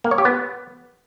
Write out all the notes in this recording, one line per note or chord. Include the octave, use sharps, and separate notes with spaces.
A#3
C#5
G4
B3